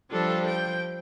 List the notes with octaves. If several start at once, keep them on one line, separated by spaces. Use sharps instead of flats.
F3 G3 D4 A4
G5